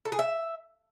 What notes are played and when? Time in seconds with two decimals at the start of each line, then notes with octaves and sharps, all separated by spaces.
0.05 A4
0.12 G#4
0.19 E5